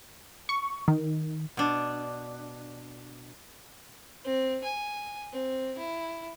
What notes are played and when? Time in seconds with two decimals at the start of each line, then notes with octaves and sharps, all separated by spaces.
0.49 C#6
0.88 D#3
1.57 B2 D4
4.25 C4
4.64 G#5
5.32 C4
5.78 E4